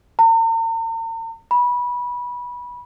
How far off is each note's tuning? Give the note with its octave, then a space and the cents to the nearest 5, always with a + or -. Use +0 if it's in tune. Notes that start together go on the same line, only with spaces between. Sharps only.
A#5 -45
B5 -20